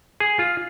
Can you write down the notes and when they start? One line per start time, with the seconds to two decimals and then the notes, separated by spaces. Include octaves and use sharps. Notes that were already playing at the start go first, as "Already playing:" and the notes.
0.20 G#4
0.39 F4